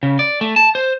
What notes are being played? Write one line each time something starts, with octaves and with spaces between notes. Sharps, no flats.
C#3
D5
A3
A5
C5